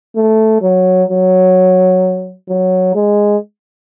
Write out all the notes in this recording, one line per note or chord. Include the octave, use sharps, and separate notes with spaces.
A3
F#3
F#3
F#3
G#3